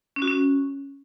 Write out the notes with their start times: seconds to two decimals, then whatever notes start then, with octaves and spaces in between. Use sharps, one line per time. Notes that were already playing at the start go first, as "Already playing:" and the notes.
0.16 C#4
0.22 F#4
0.28 C#4